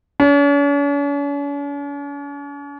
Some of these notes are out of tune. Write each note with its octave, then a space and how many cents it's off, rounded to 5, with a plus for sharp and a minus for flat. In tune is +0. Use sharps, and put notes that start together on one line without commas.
C#4 +45